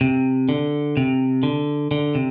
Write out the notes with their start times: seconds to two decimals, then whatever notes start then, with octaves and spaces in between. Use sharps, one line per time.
0.01 C3
0.49 D3
0.97 C3
1.43 D3
1.91 D3
2.15 C3